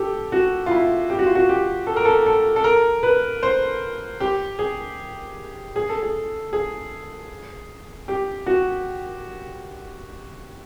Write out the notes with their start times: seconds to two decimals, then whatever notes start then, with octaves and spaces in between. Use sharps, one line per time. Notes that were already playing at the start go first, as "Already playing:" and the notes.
Already playing: G4 A4
0.32 F#4
0.66 F4
0.71 E4
1.10 G4
1.19 F#4
1.26 F4
1.35 F#4
1.49 G4
1.87 A4
1.96 A#4
2.05 A4
2.26 A4
2.56 A4
2.64 A#4
3.03 B4
3.43 C5
4.20 G4
4.59 G#4
5.76 G#4
5.89 A4
6.02 G#4
6.53 G#4
8.08 G4
8.46 F#4